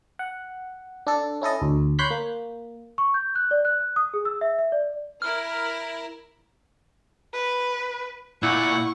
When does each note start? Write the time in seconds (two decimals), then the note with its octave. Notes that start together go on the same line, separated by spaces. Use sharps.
0.19 F#5
1.07 D4 A4
1.42 C#4 E4 A4 D#5
1.62 D2
1.99 C#5 B5 C6 F#6 G6 B6
2.11 A#3
2.98 C#6
3.14 G6
3.35 F#6
3.51 D5
3.65 F#6
3.80 F#6
3.96 D#6
4.14 G#4
4.25 E6
4.41 E5
4.59 E5
4.72 D5
5.22 E4 A#4 F6
7.33 B4
8.43 A#2 E4 F#5 C#6